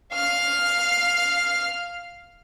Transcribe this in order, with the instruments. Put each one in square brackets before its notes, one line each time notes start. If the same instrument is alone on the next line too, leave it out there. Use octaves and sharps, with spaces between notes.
[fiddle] F5 F6